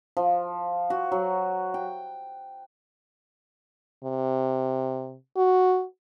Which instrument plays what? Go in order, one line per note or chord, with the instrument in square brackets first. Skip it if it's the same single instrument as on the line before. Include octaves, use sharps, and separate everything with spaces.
[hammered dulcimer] F3
F#4
F#3
G5
[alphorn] C3
F#4